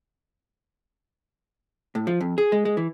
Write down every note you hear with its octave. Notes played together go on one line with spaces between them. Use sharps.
A2
F3
F2
G#4
G#3
G#3
E3